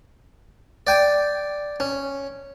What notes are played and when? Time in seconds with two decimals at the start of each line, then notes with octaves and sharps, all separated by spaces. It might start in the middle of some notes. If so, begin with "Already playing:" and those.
0.87 D5 G5 G#5
1.80 C#4